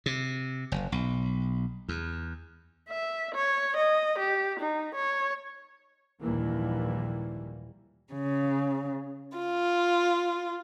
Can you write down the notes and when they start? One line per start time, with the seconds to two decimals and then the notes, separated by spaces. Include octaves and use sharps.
0.06 C3
0.72 F#1
0.92 B1
1.89 E2
2.89 E5
3.35 C#5
3.77 D#5
4.19 G4
4.60 D#4
4.95 C#5
6.21 A#1 D#2 G#2 E3 G3 A#3
8.14 C#3
9.37 F4